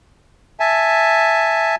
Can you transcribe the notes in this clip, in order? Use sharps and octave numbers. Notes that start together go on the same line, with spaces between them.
E5 G#5 A5